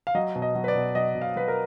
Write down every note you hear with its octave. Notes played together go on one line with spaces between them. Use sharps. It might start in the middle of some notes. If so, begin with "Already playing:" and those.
F5
F#3 D#5
B2
D#5
F#3
B4
D5
B2
F#3 D#5
B2
F5
F#3 B4
A#4